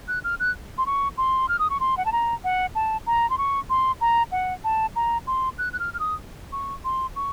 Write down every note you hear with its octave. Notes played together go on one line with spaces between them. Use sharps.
F#6
F6
F#6
C6
C#6
C6
F6
D#6
C#6
C6
F#5
A5
A#5
F#5
A5
A#5
C6
C#6
C6
A#5
F#5
A5
A#5
C6
F#6
F#6
F6
F6
D#6
C#6
C6
C#6